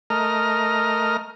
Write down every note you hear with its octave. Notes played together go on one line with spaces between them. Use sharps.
A3 A#4 D#5 A#5 F6